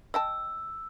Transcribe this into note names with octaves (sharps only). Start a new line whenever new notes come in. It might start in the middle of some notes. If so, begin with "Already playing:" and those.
D#5 G5 A5 E6